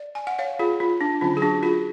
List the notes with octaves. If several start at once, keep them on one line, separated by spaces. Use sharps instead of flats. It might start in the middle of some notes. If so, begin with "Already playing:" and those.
Already playing: D5
G#5
F#5
C#5 F5
F4 G#4
F4
D4
D3 F#3 C#4 F4
G#4
D4 F#4
F4 G#4